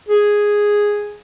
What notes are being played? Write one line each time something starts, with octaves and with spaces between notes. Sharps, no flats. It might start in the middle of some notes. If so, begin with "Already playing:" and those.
G#4